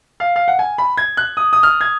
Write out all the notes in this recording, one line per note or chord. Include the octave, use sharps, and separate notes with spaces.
F5
F5
F#5
G#5
B5
G#6
F#6
D#6
D#6
F6
G#6